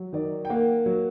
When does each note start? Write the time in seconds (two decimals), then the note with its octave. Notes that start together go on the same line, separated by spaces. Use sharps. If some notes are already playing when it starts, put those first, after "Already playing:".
Already playing: F#3
0.13 D#3 D5
0.45 G5
0.49 A#3 F#5
0.86 F#3